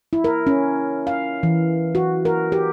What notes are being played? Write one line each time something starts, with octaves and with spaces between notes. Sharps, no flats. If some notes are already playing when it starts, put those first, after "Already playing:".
E4
A#4
C#4
F5
E3
F#4
A#4
G4